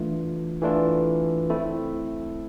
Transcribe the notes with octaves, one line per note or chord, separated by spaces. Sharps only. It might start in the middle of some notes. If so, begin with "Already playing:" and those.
Already playing: E3 A3 D4 F4
E3 A3 D4 F4
A3 C4 E4 A4